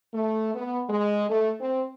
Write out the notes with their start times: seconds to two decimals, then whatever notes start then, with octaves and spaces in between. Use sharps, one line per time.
0.14 A3
0.55 B3
0.89 G#3
1.29 A3
1.60 C4